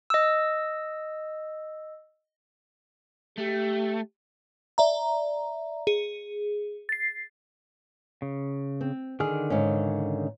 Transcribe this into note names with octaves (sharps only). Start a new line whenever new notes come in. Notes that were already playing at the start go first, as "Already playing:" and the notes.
D#5 E6
A3 G4
D5 E5 A#5
G#4
A6 C7
C#3
C4
D3 D#3 G#4 F6
G#2 C#3 C#4